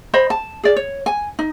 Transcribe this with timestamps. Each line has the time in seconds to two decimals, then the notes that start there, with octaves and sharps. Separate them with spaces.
0.14 C5 D#5 B5
0.30 A5
0.63 G#4 D5
0.76 C#5
1.06 G#5
1.39 D#4